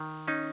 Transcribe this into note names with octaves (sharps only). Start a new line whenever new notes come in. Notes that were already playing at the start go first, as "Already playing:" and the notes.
Already playing: D#3
C#4 D#4